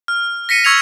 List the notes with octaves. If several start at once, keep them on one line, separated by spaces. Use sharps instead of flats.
F6
A#6 B6 C#7 D#7
C#6 E6 G#6 C#7 F7